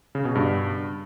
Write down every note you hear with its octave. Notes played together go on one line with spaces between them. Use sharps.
C#3
B2
G2